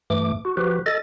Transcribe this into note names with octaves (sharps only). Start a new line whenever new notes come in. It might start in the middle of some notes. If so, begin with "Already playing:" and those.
G2 E3 A3 D6
F#4
F3 F#4 G4 B4
A4 D#5 A6